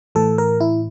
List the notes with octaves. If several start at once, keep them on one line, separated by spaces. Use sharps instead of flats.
A2 E3 A4
A#4
E4